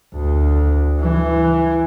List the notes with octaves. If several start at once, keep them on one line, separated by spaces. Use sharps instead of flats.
D2
E3